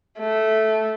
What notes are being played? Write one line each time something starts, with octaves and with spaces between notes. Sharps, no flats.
A3